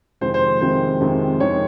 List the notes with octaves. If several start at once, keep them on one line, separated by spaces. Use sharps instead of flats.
F2 C3 D#3 G#3 C5
C5
F2 C3 D#3 G#3 C5
F2 C3 D#3 G#3
F2 C3 D#3 G#3 C#5